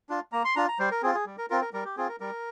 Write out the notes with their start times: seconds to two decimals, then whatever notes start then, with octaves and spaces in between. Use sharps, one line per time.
0.09 D4 F4
0.32 A#3 A#5
0.45 C6
0.56 D4 F4 A#5
0.68 A#5
0.79 G3 C5
0.91 A#4
1.03 C4 G#4
1.06 F4
1.15 G#4
1.26 G3
1.38 A#4
1.50 C4 F4 A#4
1.62 A#4
1.73 G3 A#4
1.85 G4
1.97 C4 F4 G#4
2.09 A#4
2.20 G3 A#4